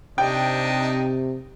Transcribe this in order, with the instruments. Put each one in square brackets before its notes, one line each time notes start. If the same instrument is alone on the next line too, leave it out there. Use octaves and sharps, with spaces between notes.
[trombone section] C3 [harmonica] D4 D#4 D#5 [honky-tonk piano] G5